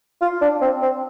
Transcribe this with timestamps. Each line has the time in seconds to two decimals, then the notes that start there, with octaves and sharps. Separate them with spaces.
0.21 F4
0.41 D4
0.61 C4
0.82 C4